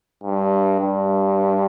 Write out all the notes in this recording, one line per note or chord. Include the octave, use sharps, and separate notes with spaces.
G2
G2